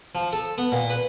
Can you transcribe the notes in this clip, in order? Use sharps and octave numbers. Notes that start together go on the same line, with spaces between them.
F3
A4
B3
A#2
B4